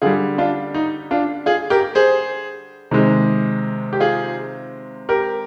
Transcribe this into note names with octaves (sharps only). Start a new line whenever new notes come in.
D3 G3 F4 G#4
D4 F4
D#4
D4 F4
F4 G#4
G4 A#4
G#4 C5
C3 D#3 G#3
G4
F4 G#4
G4 A#4